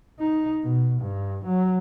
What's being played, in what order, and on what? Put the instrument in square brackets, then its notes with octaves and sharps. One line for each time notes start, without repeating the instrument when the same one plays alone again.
[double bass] D#4
B2
G2
F#3